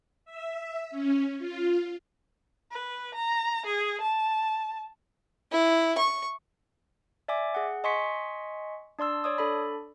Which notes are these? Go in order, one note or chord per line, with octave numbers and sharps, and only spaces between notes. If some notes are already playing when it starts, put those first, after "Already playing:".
E5
C#4
F4
B4
A#5
G#4
A5
E4
C#6
D5 E5 G#5 D6
G#4 F#5
D#5 G#5 C6 C#6 B6 C#7
D4 D5 C6 E6
C#5 D5 D#6
D4 A4 D5 B5